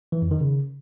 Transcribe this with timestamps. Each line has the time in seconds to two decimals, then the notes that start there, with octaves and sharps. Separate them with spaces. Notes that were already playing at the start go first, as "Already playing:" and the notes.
0.12 E3
0.22 F2
0.31 D#3
0.41 C#3